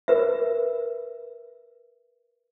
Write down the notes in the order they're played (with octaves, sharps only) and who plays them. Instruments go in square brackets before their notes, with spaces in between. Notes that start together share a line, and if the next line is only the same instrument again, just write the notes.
[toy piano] A#4 B4 E5